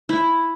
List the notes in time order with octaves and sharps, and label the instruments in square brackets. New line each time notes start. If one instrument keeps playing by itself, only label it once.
[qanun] E4